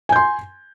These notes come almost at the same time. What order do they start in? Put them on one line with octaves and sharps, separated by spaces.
G#5 G6 C6